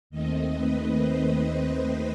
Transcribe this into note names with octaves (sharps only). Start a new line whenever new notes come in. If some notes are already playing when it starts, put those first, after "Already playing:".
D#2 D#3 A3 C4 D#5
B4
C5
D#5